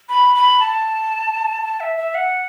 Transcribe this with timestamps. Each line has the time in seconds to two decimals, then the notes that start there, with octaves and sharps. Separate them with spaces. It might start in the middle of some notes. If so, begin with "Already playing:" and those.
0.09 B5
0.35 B5
0.60 A5
1.62 A5
1.80 E5
1.97 E5
2.15 F#5